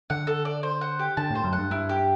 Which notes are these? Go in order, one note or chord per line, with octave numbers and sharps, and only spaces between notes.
D3 F#5
A4
D5
C5
F#5
G4
D3 A5
A2 C5
F#2
F#5
G2
G2 E4
G4